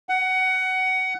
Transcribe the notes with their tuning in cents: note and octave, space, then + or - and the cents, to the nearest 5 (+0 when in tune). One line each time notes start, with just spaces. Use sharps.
F#5 +20